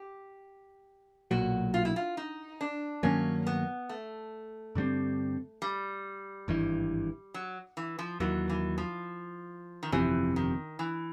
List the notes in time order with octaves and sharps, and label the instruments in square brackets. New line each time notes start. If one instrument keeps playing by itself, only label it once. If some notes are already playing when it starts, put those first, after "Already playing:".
Already playing: [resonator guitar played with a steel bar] G4
[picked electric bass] B1 A#2 F#3 [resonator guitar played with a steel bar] F#4
[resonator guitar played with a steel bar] F4
E4
F4
D#4
D4
[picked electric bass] G2 D#3 F#3 A#3 [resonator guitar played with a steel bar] C#4
[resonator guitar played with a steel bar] B3
A3
[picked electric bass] G2 D3 G3 C4
[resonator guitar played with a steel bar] G3
[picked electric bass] G#1 G2 E3
[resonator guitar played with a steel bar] F#3
E3
F3
[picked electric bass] D#2 D#3 F#3 [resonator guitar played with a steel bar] E3
[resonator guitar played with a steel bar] E3
F3
D#3
[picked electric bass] G1 F2 C3 [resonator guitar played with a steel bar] E3
[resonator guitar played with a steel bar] D#3
E3